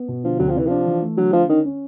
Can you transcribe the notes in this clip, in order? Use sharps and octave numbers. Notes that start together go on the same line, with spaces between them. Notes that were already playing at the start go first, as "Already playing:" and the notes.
Already playing: B3
B2
D3 F3
D2 F#3
F3
C3 E3
F3 D4
E3
A3
D3 F#3
D3 F3
D#3 C#4
C#4